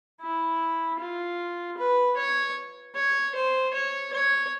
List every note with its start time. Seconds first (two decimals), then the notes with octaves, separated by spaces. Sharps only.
0.21 E4
0.99 F4
1.78 B4
2.17 C#5
2.95 C#5
3.35 C5
3.74 C#5
4.13 C#5